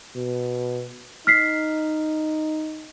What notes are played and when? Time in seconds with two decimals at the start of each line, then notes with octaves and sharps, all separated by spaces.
0.16 B2
1.27 D#4 F6 B6 C7